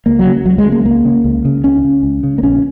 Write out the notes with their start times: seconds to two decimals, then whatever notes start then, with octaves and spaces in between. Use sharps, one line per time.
0.06 C#2 A#3
0.19 F#3
0.25 C#3
0.45 C#2 F#3
0.58 G#3
0.65 C#3
0.72 A#3
0.85 C#2 A#3
1.05 C#3
1.24 C#2
1.45 C#3
1.64 C#2 C#4
1.84 C#3
2.03 C#2
2.23 C#3
2.38 A#3
2.43 A#1 C#4